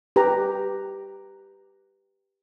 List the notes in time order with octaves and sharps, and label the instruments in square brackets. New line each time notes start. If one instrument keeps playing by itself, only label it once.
[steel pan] G4 B4 A#5